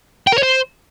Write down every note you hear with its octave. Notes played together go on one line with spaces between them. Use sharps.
G5
A#4
C#5
C5